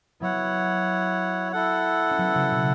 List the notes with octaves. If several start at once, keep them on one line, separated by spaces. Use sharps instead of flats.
F#3 B3 E4 C#5 F#5
E4 A4 F#5
C#4
F#3 B3
C#3 F#3
B2